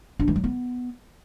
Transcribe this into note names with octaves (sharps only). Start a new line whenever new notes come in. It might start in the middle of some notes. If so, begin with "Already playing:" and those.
D4
E3
F#3
B3